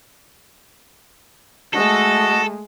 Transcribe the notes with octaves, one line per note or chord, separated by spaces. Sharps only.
G#3 A3 F#4 A4 D#5